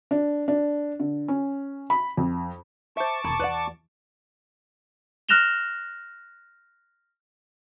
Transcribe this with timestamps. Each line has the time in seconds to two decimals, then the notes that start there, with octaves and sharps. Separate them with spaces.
0.11 D4
0.48 D4
1.00 D3
1.28 C#4
1.90 B5
2.17 F2
2.97 C5 E5 A5 C#6 D6
3.24 E1 D3 A#3 G#4 B5
3.39 E2 B4 D5 F#5
5.29 F6 F#6 A#6 E7 F7 G7